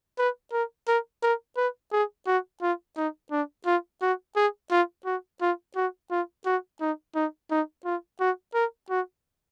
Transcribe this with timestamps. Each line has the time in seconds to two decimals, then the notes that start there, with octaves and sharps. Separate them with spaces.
0.19 B4
0.53 A#4
0.88 A#4
1.23 A#4
1.57 B4
1.92 G#4
2.27 F#4
2.62 F4
2.97 D#4
3.31 D4
3.66 F4
4.02 F#4
4.36 G#4
4.71 F4
5.06 F#4
5.41 F4
5.76 F#4
6.11 F4
6.46 F#4
6.81 D#4
7.16 D#4
7.51 D#4
7.85 F4
8.20 F#4
8.55 A#4
8.90 F#4